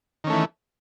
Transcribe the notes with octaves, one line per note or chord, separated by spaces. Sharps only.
D#3 E3 A3 C#4